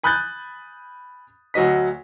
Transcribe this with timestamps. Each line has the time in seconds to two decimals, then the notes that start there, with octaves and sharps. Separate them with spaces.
0.03 G#5 B5 D#6 F#6 G6 A6
1.54 D2 F#3 F#4 D#5 B6